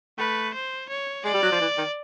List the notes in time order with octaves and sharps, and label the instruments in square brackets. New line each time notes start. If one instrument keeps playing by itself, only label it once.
[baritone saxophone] A3 [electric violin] B4
[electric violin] C5
C#5
[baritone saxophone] G#3 [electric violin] D5
[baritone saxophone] G3
F#3
F3
E3
D#3